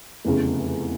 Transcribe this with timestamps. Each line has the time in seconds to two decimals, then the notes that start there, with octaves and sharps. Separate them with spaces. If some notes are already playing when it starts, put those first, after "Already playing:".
0.25 F1 E2 C#3